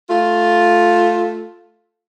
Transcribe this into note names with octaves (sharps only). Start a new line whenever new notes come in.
A3 F4